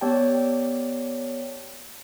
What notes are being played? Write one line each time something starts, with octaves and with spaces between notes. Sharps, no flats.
B3 G4 C#5 D5 G5 A5